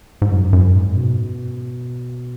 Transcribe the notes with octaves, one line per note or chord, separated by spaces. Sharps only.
G#2
F#2
F#2
G#2
B2